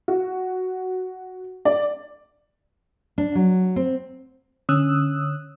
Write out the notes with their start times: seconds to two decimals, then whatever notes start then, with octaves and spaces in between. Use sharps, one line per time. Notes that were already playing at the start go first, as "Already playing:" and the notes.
0.08 F#4
1.65 D5
3.18 D4
3.35 F#3
3.76 C4
4.69 D3 C#4 D#6 E6 F#6